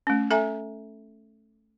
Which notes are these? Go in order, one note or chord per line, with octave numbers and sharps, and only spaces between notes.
A3 C#4
A4 E5 G#5 A#5